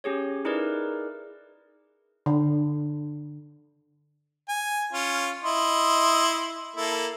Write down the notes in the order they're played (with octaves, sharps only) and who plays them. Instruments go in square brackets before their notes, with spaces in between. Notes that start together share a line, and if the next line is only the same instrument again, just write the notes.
[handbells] C#4 G4 G#4 C#5
D#4 E4 G#4 A#4 B4 D5
[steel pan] D3
[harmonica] G#5
C#4 F4
E4 D#5 C6
A#3 E4 A4